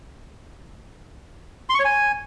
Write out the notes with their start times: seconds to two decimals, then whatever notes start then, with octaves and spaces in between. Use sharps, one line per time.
1.69 C6
1.74 C#6
1.80 C#5
1.85 G#5